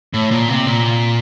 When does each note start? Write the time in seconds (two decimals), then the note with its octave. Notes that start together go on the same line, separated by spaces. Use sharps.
0.14 A2
0.31 A#2
0.48 C3
0.66 A#2